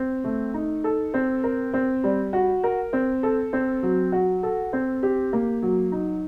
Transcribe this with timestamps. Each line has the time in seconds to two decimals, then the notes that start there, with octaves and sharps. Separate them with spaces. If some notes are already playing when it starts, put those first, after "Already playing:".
Already playing: C4
0.24 A3
0.54 D#4
0.84 A4
1.14 C4
1.44 A#4
1.74 C4
2.04 G3
2.33 F#4
2.64 A#4
2.93 C4
3.23 A4
3.53 C4
3.83 F#3
4.12 F#4
4.43 A4
4.73 C4
5.03 G4
5.33 A#3
5.62 F#3
5.92 D#4